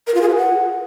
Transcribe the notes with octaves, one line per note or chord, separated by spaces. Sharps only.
A#4
F4
G#4
B4
F#5